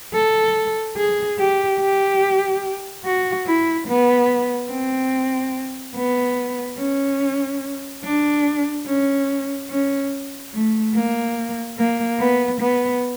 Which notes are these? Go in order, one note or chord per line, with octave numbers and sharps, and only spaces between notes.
A4
G#4
G4
G4
F#4
E4
B3
C4
B3
C#4
D4
C#4
C#4
A3
A#3
A#3
B3
B3